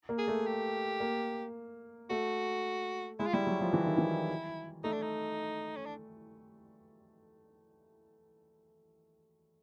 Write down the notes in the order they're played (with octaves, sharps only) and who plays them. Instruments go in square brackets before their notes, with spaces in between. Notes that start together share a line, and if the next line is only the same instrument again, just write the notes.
[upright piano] A#3
[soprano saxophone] G#4
[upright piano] A3
[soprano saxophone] G4
[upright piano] A#3
[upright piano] A3 [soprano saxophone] F#4
[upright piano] G#3 [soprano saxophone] E4
[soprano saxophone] F4
[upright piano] G3 [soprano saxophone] E4
[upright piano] F#3
F3
E3
D#3
E3
[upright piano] A3 [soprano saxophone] D#4
[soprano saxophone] D4
D#4
C#4
D4